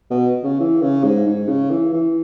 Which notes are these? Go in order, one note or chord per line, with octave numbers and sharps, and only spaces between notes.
B2
C#3
E3
C#3
G#2
G#2
C#3
E3
E3